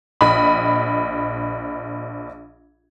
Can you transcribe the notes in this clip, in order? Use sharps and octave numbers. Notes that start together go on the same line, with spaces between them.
A#1 D#5 B5